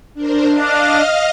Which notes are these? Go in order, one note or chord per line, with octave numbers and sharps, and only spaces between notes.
D4 A#4 C5
D4 D#5 F5 F6